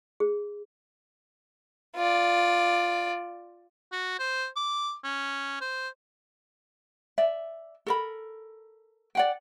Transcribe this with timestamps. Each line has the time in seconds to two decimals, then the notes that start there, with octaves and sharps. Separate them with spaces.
0.20 G#4
1.96 F4 D5
3.92 F#4
4.19 C5
4.56 D6
5.04 C#4
5.61 C5
7.18 D5 E5
7.87 A4 A#4 B5
9.15 D5 F#5 G5